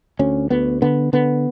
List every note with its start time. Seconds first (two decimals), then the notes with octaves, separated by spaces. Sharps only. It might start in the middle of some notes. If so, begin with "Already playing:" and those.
0.19 D2 C#4
0.50 D2 B3
0.82 D3 B3
1.13 D3 B3